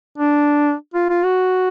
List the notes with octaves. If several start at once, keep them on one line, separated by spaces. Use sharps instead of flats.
D4
F4
F4
F#4